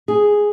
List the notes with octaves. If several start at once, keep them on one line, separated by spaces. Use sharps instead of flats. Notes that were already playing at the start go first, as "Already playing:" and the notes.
G#4